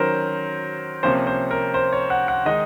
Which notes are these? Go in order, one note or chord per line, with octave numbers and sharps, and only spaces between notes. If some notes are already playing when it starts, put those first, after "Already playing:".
Already playing: D#3 F#3 C#4 A#4 C5
C3 F3 A#3 C#4 C5
C5
A#4
C5
C#5
F#5
F#5
D#3 G#3 D#4 D#5